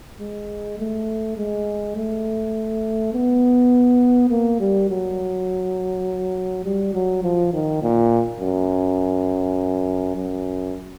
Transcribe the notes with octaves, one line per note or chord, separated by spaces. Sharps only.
G#3
A3
G#3
A3
B3
A#3
G3
F#3
G3
F#3
F3
D#3
A#2
F#2
F#2